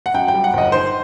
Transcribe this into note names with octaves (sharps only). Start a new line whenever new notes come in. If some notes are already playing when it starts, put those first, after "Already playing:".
F#5
F#2 G5
G5
G3
F#5
G1 D#5
D#3 C5